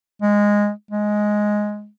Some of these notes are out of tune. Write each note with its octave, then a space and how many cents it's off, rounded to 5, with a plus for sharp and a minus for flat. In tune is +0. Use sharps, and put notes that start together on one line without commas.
G#3 -10
G#3 +5